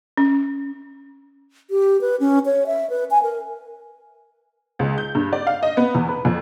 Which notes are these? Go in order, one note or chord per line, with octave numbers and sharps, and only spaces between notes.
C#4
G4
B4
C#4
C#5
E5
B4
G#5
A#4
C#2
G6
G2
D5
F5
D#5
B3
E2
B4
F2